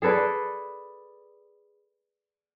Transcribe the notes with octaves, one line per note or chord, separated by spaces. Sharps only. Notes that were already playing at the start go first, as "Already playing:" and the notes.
G#4 A4 B4 D5